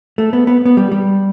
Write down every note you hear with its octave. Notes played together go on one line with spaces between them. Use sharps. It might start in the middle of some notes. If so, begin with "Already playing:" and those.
A3
B3
B3
B3
G3
G3